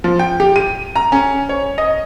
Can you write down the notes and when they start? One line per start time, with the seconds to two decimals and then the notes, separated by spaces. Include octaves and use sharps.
0.04 F3
0.19 G5
0.40 G4
0.56 D#7
0.96 A#5
1.12 C#4
1.49 C#5
1.78 D#5